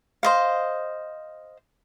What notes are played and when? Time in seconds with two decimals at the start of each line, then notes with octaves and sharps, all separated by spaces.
0.23 C5 D#5 F5